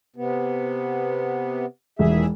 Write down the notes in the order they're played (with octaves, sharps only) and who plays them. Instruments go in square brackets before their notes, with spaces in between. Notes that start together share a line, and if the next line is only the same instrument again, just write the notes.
[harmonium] C3 B3
[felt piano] E1 E3 [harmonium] D#2 G#4 E5